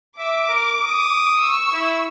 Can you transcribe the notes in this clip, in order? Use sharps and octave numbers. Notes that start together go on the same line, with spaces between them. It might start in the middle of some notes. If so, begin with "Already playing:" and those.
E5 D6
A#4
D#6
C#6 E6
E4